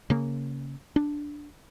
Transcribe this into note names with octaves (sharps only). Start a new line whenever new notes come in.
C#3 A#3
D4